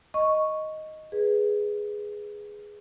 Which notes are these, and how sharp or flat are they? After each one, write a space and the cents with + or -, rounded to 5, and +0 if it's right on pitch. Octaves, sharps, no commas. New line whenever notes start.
D#5 +0 C#6 +0
G#4 +0 B4 +0